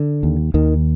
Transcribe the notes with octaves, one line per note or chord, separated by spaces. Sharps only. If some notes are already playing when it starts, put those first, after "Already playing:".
Already playing: D3
D#2
D#2 D#3